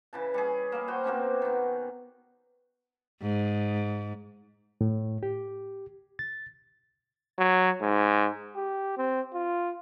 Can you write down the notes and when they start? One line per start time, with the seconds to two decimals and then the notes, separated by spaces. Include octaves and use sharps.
0.13 C#3 E3 A5
0.34 G3 C#4 G#4
0.72 A#3 F5
0.88 F#4 C5 G5
1.04 B2 A#3 C4 C#4
1.42 D#3 B3
3.22 G#2
4.81 A2
5.23 G4
6.19 A6
7.39 F#3
7.82 G#2
8.56 G4
8.97 C4
9.34 F4